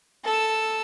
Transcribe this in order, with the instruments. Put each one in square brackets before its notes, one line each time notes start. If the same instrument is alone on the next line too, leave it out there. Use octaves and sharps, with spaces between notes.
[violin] A4 E6